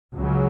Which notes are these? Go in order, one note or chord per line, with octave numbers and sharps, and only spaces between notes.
C#2 C#3 F#3